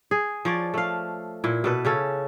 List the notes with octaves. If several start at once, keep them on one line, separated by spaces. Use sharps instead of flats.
G#4
F3 C#5 D5
A3 F5
A#2 E4
B2 A4 B4
C#3 C#4 A4